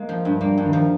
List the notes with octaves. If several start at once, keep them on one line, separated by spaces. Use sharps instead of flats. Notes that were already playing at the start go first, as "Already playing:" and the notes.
Already playing: G#3 A#3
F3
G2
G3 A#3
G2
D#3
F3